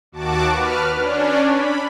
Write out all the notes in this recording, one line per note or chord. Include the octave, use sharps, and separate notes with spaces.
D#2 F#4 A5 D6
B4 F6
C#4 D4
B5